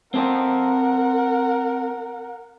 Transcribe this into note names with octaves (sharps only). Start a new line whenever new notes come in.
C4 A4 A#4 C5 F#5